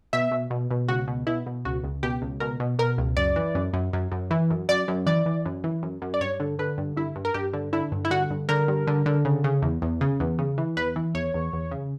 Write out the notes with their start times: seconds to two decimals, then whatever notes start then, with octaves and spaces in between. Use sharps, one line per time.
0.13 B2 E5
0.32 B2
0.50 B2
0.71 B2
0.89 C#2 F#4
1.08 B2
1.27 B2 E4
1.46 B2
1.65 C#2 F#4
1.84 C#2
2.03 B2 G4
2.22 C#2
2.40 B2 A#4
2.60 B2
2.79 B2 A#4
2.98 C#2
3.17 F#2 D5
3.36 E3
3.55 F#2
3.73 F#2
3.93 F#2
4.12 F#2
4.31 E3
4.50 F#2
4.69 F#2 D5
4.88 F#2
5.06 E3 D5
5.26 E3
5.46 F#2
5.64 E3
5.83 F#2
6.02 F#2
6.14 D5
6.21 G2 C#5
6.40 D3
6.59 D3 B4
6.78 G2
6.97 G2 E4
7.16 G2
7.25 A#4
7.34 G2 G4
7.53 D3
7.73 D3 E4
7.92 G2
8.05 E4
8.11 D3 F#4
8.31 G2
8.49 D3 A#4
8.68 G2
8.87 D3
9.06 D3
9.25 C#3
9.44 C#3
9.62 E2
9.82 E2
10.01 C#3
10.20 E2
10.39 C#3
10.58 E3
10.77 E2 B4
10.96 E3
11.15 E2 C#5
11.34 E2
11.53 E2
11.71 C#3